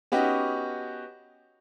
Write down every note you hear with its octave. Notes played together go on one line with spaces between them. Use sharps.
B3 C#4 D#4 F#4 G4